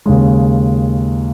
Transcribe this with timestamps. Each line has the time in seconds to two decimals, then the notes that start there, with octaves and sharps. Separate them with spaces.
0.06 D#2 C#3 G#3